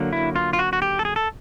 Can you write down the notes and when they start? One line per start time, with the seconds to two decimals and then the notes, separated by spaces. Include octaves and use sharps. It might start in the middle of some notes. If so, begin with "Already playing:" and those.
Already playing: D3 F#3 A#3
0.13 E4
0.36 F4
0.53 F4
0.59 F#4
0.73 F#4
0.82 G4
0.99 A4
1.05 G#4
1.16 A4